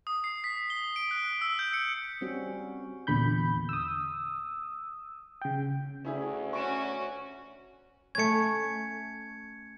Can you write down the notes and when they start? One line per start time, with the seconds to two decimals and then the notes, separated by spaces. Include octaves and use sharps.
0.07 D#6
0.24 C7
0.44 B6
0.70 G7
0.96 D7
1.11 F#6
1.41 E6
1.59 G6
1.73 C#7
2.21 G3 C4 C#4 F#4
3.07 E2 A#2 D3 B5 G6
3.69 D#6 E6
5.41 C#3 G5
6.05 D2 C#4 E4 G#4
6.53 C#4 F#4 C#6 D7 E7
8.15 A3 C#4 G#6 C#7